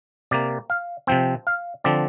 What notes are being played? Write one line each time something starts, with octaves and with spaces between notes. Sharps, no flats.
C3 A#3 D5
F5
C3 F3 C4 G5
F5
D3 F3 C4 D5